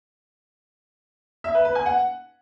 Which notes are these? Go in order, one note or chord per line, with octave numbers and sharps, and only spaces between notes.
E5
B4
B4
G#5
F#5